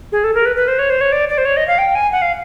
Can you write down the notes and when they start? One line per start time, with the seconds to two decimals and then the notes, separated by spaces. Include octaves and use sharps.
0.12 G#4
0.24 A4
0.34 A#4
0.46 B4
0.56 B4
0.68 C5
0.79 C#5
0.90 C5
1.01 C#5
1.12 D5
1.29 D5
1.38 C5
1.45 C#5
1.57 D#5
1.68 F5
1.78 G5
1.95 G#5
2.12 F#5
2.22 F5